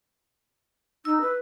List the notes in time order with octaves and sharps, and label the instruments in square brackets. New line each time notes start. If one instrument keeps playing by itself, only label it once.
[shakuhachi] D#4 [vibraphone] E6
[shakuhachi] B4